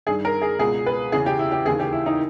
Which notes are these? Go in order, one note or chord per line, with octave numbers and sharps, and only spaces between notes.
G2 D#3 G#4
A#4
G#4
C#2 B2 G#4
B4
E2 C#3 E3 G#4
G4
E4
G4
D#2 C#3 E3 G#4
G4
E4
D#4